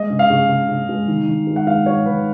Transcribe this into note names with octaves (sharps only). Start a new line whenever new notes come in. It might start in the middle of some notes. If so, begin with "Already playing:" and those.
Already playing: G#3 D#5
C#3
F5
C#3
C#3
C#3
G#3
D#3
D#3
G#3
F#5
G#3 F5
G#3 C#5
D#3 B4